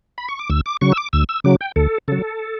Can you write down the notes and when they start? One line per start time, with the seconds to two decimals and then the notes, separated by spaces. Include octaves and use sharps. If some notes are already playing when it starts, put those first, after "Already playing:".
0.18 B5
0.29 C#6
0.39 D6
0.50 D2 E6
0.66 D6
0.81 C#3 F#3 C#6
0.92 E6
0.97 D6
1.13 D2 E6
1.29 E6
1.44 C#3 F#3 D6
1.61 G5
1.76 D2 A4
2.08 C#3 F#3 A4